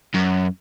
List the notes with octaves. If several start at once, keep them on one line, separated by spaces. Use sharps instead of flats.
F#2